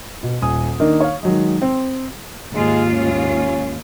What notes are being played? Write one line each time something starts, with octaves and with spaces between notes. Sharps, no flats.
B2
D#1 G#5 D#6
D#3 A#3 D4 D#4
C#5 F5
D#3 F#3 G#3
C4
D#2 G#2 G#3 F4
C#4